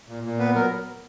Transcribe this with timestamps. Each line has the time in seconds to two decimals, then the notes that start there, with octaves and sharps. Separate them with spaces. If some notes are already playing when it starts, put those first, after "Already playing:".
0.08 A#2
0.23 A#2
0.39 B3 B4
0.55 F#3 A#4